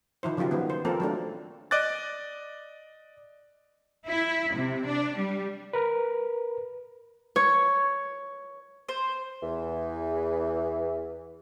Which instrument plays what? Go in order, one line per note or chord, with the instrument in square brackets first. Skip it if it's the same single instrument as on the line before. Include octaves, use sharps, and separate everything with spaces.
[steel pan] D#3 F3 E4 C5
C#3 F3 F#3 F4 G4
D#3 G3 B3
C5
F3 A#3 C4 A4 A#4
F#3 A3 D4
[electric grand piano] D5 D#5 D6 F#6 A6
[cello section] E4
C3
D4
G3
[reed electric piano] A#4 B4
[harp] C#5
[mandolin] C5
[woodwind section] E2 [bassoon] E3